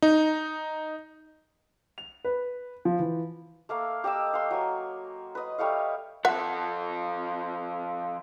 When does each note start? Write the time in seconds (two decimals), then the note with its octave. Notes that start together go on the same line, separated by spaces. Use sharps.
0.02 D#4
1.98 F7
2.25 B4
2.85 F3
2.99 E3
3.69 A3 A#3 F5
4.04 G4 D#5 D6 E6
4.33 F5 C6
4.51 F#3 G#5
5.35 B4 D#5
5.58 G3 A3 C#5 F5
6.25 F3 A4 E5 F#5